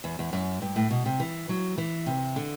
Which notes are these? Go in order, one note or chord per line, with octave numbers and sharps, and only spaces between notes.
E2
E2
F#2
G2
A2
B2
C3
E3
F#3
E3
C3
D3